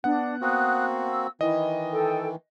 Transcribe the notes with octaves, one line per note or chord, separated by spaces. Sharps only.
B3 D4 F#5
A#3 C4 F#4 D#6 F#6
E6
D#3 E3 E4 D#5
A4 G5